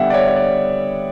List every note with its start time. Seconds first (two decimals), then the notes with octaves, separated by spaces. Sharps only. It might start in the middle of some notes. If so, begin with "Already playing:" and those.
Already playing: D3 G3 B3 E5 F#5 G5
0.10 D5
0.14 C#5
0.28 C#5
0.36 D5